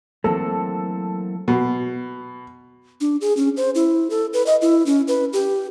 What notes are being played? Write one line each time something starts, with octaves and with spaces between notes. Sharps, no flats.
E3 F#3 A3 A#3 C4 A4
B2
D4
G#4
C#4
C5
E4
A4
B4
D#5
E4
C#4
B4
G4